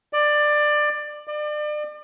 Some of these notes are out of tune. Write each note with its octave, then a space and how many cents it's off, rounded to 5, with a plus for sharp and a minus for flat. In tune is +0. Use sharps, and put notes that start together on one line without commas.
D5 +20
D5 +35